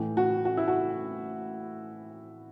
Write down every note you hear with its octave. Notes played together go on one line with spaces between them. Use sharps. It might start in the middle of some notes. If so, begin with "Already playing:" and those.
Already playing: A2 E3
F#4
F#4
E4
F#4